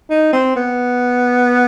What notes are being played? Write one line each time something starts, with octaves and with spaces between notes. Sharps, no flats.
D#4
C4
B3